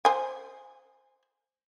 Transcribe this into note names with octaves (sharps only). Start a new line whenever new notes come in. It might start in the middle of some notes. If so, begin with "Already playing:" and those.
C5 G#5